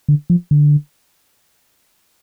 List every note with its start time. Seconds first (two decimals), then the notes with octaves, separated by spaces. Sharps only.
0.09 D3
0.30 F3
0.51 D3